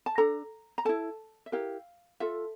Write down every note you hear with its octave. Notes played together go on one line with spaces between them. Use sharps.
A5
D4 A4 A#5
A#5
E4 A4 A5
E5
E4 G4 A#4 F5
F4 A4 E5